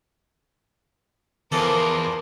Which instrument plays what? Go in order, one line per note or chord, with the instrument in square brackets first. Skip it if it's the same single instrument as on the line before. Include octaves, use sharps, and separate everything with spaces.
[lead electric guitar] E2 [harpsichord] E3 F3 A4 [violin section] A#4 C5 [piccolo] D6